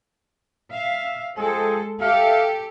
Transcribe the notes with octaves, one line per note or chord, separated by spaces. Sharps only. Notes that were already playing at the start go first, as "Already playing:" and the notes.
E5 F5
F3 G#3 C4 G#4 A4
G4 A4 E5 F5